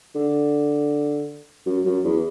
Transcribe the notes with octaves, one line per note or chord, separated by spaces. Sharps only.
D3
F#2
F#2
E2